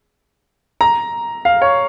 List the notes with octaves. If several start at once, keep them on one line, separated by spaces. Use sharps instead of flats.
A#5
F5
C#5